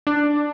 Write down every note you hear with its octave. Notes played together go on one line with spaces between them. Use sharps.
D4